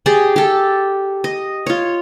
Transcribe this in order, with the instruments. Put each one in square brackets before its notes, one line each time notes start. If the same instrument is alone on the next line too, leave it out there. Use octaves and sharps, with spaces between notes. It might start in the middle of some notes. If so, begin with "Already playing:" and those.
[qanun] G4 G#4 D5
G4 A4
D#5
F4 C#5